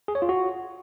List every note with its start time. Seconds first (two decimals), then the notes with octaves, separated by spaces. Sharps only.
0.08 G#4
0.15 C#5
0.22 F4
0.29 F#4